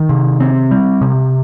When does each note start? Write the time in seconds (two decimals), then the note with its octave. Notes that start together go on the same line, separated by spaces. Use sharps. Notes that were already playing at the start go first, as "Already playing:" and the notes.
Already playing: D#3
0.09 C3
0.40 C4
0.71 G3
1.01 C3